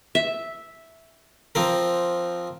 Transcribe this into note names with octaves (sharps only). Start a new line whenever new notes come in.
E5
F3 C4 A#4